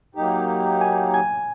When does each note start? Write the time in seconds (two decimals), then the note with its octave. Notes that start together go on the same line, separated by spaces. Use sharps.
0.15 F#3 A#3 D#4 G4
0.81 G#5
1.14 G#5